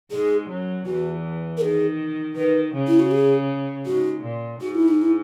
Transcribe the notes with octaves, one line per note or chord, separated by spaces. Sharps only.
G#2 G#3 G#4
F#2 F#3
E2 E3 F#4
A#4
D#3 G#4
D#3 B4
C#3
E4
F#4
G#4
G#2 F#4
A#2
G#2 F#4
E4
D#4
E4